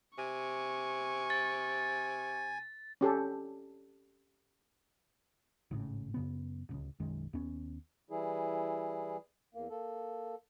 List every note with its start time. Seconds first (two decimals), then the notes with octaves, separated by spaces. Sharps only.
0.18 C3 G#5 C#6
1.30 A6
3.01 C#4 G4 A4
5.71 G#1 A2 C#3
6.14 F#2 C#3 B3
6.69 D1 C#2
7.00 B1 F#2 D#3 G#3
7.33 D#2 B3 C#4
8.10 E3 G3 E4 G#4
9.54 E2 A#3
9.70 A#3 A4